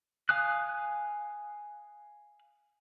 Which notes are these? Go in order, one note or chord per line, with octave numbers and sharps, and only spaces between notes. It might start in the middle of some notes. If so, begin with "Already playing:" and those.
F5 G#5 D#6 F#6